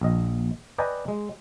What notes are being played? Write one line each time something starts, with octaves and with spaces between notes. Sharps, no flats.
A#1 D#5
B4 D5 D#5 G5 G#5 A#5
G#3